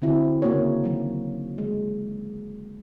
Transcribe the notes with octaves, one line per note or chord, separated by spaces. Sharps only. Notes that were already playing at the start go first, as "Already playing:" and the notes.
D3 C4 E4 F#4
C#3 A#3 F#4 C#5
D#3 F#3
G#3